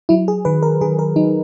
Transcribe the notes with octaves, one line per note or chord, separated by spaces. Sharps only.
F#3 E4
G#4
D#3 B4
A#4
D#3 G#4
A#4
F#3 D#4